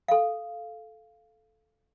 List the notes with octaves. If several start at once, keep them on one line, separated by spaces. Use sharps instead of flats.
A4 F5